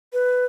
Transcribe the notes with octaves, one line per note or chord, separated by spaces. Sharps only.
B4